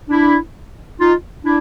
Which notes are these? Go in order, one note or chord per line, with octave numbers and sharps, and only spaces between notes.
D4 E4
D#4 F4
D4 E4